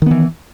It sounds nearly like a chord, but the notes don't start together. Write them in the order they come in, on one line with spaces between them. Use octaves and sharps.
D#3 B3 E3